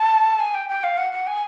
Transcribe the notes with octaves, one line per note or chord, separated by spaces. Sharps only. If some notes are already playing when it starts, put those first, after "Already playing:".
Already playing: A5
G#5
G5
G5
F5
F#5
F#5
G#5